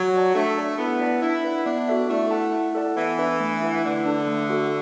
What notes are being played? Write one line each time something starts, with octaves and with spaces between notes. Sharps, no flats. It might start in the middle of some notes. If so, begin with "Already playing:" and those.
Already playing: F#3
F#4 D5 A5
A3 D4
A4 D5 A5
B3 E4
D5 A5
D4 E4
B4 F#5
B3 D4
F#4 A4 E5
A3 E4
A4 F#5 A5
E4
A4 D5 F#5 A5
E3 B3
D4 B4 E5
A3
E4 B4 F#5
D3 A3
D4 A4
A3
F#4 A4